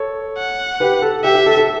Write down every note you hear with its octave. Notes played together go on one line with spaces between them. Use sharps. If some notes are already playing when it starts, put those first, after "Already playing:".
Already playing: A4 C#5
F#5
G4 B4
A4
G4 E5
G4
A4
A4